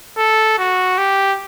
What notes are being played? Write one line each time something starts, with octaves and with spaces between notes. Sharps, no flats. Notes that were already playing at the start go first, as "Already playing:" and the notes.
A4
F#4
G4